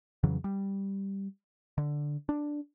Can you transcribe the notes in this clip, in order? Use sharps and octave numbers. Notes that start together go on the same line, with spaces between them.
F2 C#3 E3 F#3
G3
D3
D4